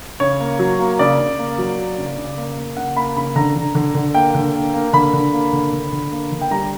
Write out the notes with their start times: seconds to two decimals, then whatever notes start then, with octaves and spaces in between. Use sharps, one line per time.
0.20 C#3 C#5
0.40 A#3
0.59 F#3
0.79 A#3
0.99 C#3 D5
1.19 C#3
1.39 A#3
1.58 F#3
1.78 A#3
1.98 C#3
2.17 C#3
2.37 A#3
2.57 A#3
2.77 C#3 F#5
2.96 A#3 B5
3.17 C#3 B5
3.36 D3 A#5
3.56 D3
3.75 D3
3.94 D3
4.14 A#3 G5
4.34 D3
4.54 A#3
4.74 A#3
4.93 D3 B5
5.13 D3
5.33 A#3
5.53 D3
5.72 D3
5.92 D3
6.11 A#3
6.32 D3
6.41 G5
6.51 G3 A#5